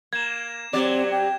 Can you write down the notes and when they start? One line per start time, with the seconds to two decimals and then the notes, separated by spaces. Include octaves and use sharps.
0.13 A#3 G#6 E7
0.73 F#3 C4 G4 D5
1.11 G5